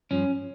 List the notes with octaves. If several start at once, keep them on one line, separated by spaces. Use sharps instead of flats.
G2 F3 C#4